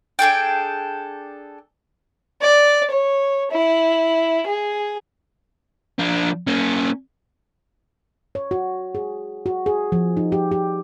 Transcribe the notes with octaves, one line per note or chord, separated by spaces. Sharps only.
D4 G#4 A4 G5
D5
C#5
E4
G#4
F3 D4
A#3 C#4
C#5
F#4
G#4
F#4
G#4
F3
D#4
G4
G4